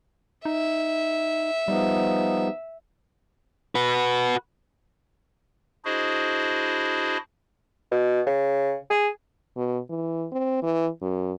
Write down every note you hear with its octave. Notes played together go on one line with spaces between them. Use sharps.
D#4 E5
F3 G3 B3 D#4
F#4 B4
D4 E4 F#4 G#4 C5 D#5
B2
C#3
G#4
B2
E3
C4
E3
F#2